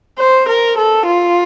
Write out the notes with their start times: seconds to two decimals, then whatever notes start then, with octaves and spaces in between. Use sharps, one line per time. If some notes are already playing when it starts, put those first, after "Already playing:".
0.19 C5
0.48 A#4
0.77 A4
1.06 F4